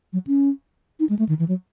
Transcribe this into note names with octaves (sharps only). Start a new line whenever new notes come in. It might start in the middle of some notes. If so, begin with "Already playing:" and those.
F#3
C#4
D#4
G#3
A3
D#3
E3
F#3